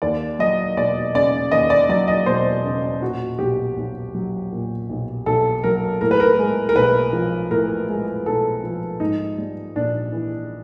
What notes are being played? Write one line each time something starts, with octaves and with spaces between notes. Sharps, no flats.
D#2 D5
F#3 D#5
E1 D5
C#3 D5
D#2 D#5
D5
F#3 D5
D#5
E1 C5
C#3
A#2 F#4
B1 G4
B1
F#3
A#2
B1
B1 A4
F#3 A#4
A2 A#4
B4
A#4
G#3
A#4
B1 B4
F3
A2 A#4
G#3
B1 A4
F3
G#2 D#4
G3
A#1 D4
E3